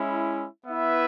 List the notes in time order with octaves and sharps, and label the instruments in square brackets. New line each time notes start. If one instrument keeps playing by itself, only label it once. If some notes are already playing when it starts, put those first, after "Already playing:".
Already playing: [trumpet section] G#3 C#4 E4
B3 E4 B4 E5